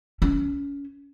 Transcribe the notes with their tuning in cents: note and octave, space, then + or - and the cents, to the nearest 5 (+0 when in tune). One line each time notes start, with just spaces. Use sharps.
C#4 +25